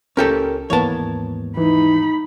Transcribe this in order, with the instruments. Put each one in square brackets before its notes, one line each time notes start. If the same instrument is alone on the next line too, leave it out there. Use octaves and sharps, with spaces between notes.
[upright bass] C#2 [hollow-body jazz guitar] C#4 G4 A4 [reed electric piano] A#4
[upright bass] D#2 G#2 [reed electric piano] E3 A#3 B3 [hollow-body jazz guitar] C#5 A5
[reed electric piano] E3 [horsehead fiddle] D#4 B5